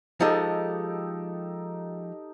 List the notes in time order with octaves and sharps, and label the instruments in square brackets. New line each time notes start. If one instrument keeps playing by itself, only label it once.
[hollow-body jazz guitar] F3 G#3 [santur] D#4 G4 A4